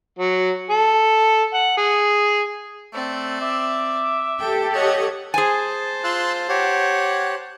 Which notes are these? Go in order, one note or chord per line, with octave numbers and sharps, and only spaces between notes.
F#3
A4
F#5
G#4
A3 C4 D5
E5 D6
G4 A4 G5
C#5 D#5 F#5
G#4 C5 G#5 A5
F4 C6 E6 F#6
G4 C#5 F#5